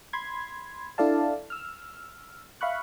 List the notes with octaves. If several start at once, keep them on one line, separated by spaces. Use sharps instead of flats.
B5 C6 G#6
D4 E4 A4 D5 F5 A5
E6 F6
E5 F5 B5 C#6 F#6